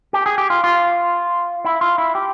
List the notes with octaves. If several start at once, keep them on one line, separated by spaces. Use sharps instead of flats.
G4
G#4
G4
F4
F4
E4
F4
E4
G4